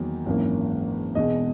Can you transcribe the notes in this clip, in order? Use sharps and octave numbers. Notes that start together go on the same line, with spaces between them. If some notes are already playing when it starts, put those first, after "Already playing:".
Already playing: E2 D#3 F#3 A#3
G#1 F#2 E3 A#3
E1 E2 B2 G#3 D#5